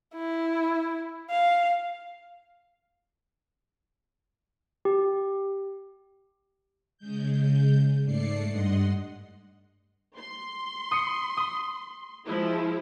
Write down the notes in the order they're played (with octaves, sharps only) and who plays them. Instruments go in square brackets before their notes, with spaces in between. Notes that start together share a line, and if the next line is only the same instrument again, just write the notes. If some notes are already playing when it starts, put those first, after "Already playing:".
[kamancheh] E4
F5
[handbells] G4
[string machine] C#3 G#3 G6
G#2 A3 D5 C7 C#7
G2 D#5 F#5 C6
[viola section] C6
[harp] D#6 C7 C#7
D#6
[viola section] F3 G#3 E4